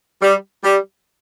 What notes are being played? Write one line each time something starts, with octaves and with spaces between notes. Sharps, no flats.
G3
G3